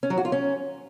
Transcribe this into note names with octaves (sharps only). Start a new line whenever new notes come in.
C#4
F#3
F#4
F4
C#4